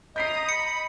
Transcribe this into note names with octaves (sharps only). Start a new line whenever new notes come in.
D#5 A#5 D#6 G6 B6 C7
B5 C#7